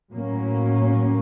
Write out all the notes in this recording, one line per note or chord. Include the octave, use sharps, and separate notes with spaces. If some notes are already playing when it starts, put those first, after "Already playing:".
A2 F#3 A#3 C#4